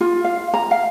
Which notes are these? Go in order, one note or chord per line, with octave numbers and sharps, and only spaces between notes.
F4
F5
A#5
F5